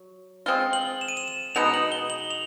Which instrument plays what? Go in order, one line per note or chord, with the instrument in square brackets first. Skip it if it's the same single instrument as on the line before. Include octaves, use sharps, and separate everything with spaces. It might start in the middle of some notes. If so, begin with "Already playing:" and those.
Already playing: [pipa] F#3
[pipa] G#3 C4 F4 [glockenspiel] G7
[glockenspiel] F#7
E7
D#7
E7
E7
[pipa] B2 G#3 B3 D#4 [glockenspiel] F7
[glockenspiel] F#7
G7
F#7
F7